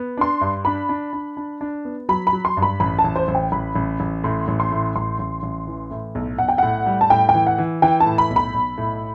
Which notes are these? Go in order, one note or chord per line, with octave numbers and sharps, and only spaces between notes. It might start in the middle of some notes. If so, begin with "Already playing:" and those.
Already playing: B3
D4 C6
G2
D4 B5
D4
D4
D4
D4
B3
F#3 B5
B5
F#3
C6
G2
B5
A1 B5
A5
A1
C5
A1
G5
A1 B5
A1
A1
A2 C6
A1
C6
A2
A1 C6
A1
A1
E3
A2
B1
B1 F#5
G5
A2 F#5
G3
A5
A2 G5
G5
E3
F#5
E3
E3 G5
A5
A2
B5
B1
B5
B1
A2